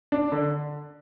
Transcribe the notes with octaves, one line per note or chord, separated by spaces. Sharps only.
D4
D3